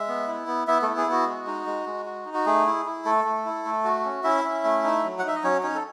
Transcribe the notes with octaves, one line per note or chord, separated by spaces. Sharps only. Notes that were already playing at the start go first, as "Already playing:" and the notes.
Already playing: G#3 E5
B3
E4
B3
B3 E4 E5
A3 E4 A4
G#4
B3 F#4
G#3
D#4
G#3
G#3
F#4
D#4
F#4
A3 G#4
E4
E4
A3 A4
A3
E4
A3
F#4
C#4
C#4 E4 E5
C#4
A3
D#4
F#3
F#5
D#4 E5
D#5
F#3 C#4 C#5
C#4 D#4 C#5
A4